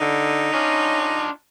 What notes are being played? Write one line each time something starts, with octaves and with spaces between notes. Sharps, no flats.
D3 D#4
C#4 D4 F4